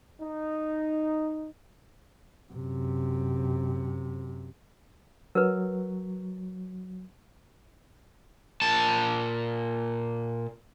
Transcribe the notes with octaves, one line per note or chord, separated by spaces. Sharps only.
D#4
F#2 C3
F#3 A#4 B4
A#2 A5